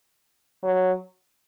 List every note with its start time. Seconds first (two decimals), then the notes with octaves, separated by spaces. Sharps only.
0.63 F#3